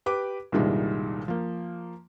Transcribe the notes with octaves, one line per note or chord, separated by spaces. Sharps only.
G4 B4 D6
C2 G2 A#2 D#3 G3 G#3
F3 A#3